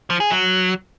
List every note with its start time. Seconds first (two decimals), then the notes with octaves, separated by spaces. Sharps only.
0.10 F3
0.20 G#4
0.30 F#3